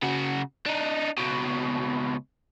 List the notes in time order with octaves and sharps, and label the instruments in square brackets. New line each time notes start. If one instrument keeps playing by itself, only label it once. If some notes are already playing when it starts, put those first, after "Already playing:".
[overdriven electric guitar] C#3 F#4
D4 D#4
C#2 B2